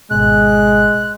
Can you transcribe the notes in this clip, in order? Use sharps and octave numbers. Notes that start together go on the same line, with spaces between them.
G#1 B2 G#3 F#6